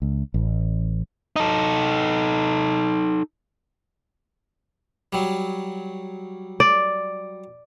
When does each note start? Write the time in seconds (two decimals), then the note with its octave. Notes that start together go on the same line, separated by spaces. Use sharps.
0.02 C#2
0.34 A1
1.36 D#4 A4
5.13 F#3 G3
6.60 D5